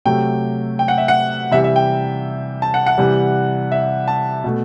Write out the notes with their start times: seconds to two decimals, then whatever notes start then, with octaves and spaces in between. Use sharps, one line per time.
0.05 C3 F#3 A3 G5
0.79 G5
0.88 F#5
0.98 E5
1.08 F#5
1.51 C3 E3 G3 E5
1.64 E5
1.76 G5
2.62 A5
2.74 F#5
2.87 F#5
2.98 C3 E3 G3
3.72 E5
4.08 A5
4.44 B2 A3